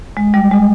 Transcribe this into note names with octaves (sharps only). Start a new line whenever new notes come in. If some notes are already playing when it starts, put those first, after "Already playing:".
G#3
G3
G#3